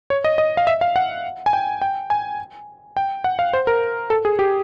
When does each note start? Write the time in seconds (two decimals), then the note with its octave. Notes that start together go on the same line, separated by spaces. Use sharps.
0.10 C#5
0.24 D#5
0.38 D#5
0.57 F5
0.67 E5
0.81 F5
0.96 F#5
1.46 G#5
1.53 G5
1.82 G5
2.10 G#5
2.97 G5
3.24 F#5
3.39 F5
3.53 C5
3.67 A#4
4.10 A4
4.25 G#4
4.39 G4